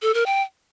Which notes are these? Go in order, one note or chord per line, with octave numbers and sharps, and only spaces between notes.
A4
A#4
G5